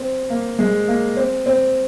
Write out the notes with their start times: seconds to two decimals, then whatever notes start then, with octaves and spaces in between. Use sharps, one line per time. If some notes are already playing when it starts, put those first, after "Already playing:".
Already playing: C4
0.30 A#3
0.59 G#3
0.88 A#3
1.17 C4
1.46 C4